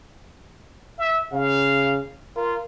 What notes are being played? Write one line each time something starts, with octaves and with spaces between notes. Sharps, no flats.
E5
C#3 F5
F4 A#4